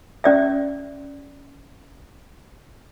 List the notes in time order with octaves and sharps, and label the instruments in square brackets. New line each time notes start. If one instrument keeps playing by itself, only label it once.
[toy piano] C#4 D5 E5